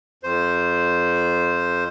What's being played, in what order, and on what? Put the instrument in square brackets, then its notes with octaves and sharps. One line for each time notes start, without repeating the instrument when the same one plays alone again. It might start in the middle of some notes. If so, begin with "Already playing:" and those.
[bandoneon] F2 C5